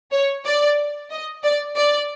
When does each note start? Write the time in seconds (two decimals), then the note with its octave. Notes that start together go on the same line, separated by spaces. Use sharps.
0.12 C#5
0.45 D5
1.10 D#5
1.43 D5
1.76 D5